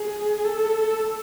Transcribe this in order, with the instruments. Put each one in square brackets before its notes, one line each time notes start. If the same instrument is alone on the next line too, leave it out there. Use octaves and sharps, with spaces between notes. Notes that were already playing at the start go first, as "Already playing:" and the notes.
Already playing: [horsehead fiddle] G#4
A4